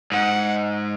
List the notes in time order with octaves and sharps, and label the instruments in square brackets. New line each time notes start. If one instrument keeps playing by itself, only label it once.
[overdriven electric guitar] G#2 [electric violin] F#5